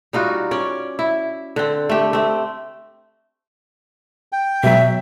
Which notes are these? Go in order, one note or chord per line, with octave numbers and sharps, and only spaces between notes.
G3 D#4 F4 F#4
C#4 D5
E4
D3 C4
A3 G4
A3 C4
G5
B2 F#3 E5